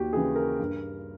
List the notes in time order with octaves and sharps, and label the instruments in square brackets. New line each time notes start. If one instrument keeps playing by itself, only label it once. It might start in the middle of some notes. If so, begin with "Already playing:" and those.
Already playing: [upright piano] D#2 F#4 G4
C#3 E3 G#4
A#4
G2